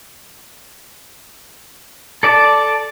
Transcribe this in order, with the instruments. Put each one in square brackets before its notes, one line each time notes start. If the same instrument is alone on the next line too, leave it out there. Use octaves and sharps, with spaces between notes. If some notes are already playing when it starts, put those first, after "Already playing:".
[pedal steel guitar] A4 D5 A5